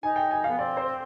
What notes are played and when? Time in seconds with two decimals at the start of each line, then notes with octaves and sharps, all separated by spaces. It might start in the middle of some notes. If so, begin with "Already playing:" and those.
0.03 D#4 G#5
0.16 G5
0.31 G#5
0.44 B3 F5
0.59 C4 D5
0.77 C5